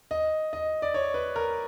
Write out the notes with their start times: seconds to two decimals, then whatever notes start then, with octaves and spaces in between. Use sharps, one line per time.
0.11 D#5
0.53 D#5
0.82 D5
0.94 C#5
1.14 B4
1.36 A#4